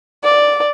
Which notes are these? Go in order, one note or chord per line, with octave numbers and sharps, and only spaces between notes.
D5